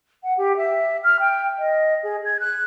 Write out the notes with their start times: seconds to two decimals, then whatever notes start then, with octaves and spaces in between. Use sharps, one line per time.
0.23 F#5
0.37 G4
0.56 E5
1.03 F6
1.20 G5
1.58 D#5
2.03 G#4
2.24 G#6
2.39 F#6